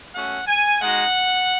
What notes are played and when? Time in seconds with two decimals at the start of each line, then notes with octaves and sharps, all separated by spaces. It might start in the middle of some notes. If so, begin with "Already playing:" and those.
0.15 A3 C#4 F#4 F#5
0.47 G#5
0.80 G#3 D#4 F#4 F#5